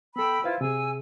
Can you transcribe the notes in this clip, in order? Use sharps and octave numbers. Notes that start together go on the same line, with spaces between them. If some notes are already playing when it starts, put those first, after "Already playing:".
B3 A4 G5 B5 E6
E4 F4 B4 C5 F5
C3 G#4 G#5 E6